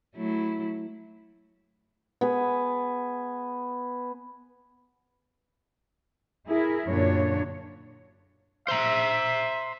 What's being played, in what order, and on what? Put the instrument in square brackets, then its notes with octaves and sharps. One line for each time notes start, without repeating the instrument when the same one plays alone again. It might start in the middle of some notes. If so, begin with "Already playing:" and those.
[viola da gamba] F#3 A3 E4
[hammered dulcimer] B3 G#4
[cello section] E4 G#4 A#4
F#2 A#2 D3 D4 C#5
[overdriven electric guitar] C5 A#5 [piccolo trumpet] E5